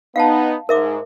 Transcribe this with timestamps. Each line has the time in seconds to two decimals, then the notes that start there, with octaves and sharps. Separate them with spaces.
0.16 B3 D#4 F5 F#5 A5
0.69 G#2 A#4 E5 D6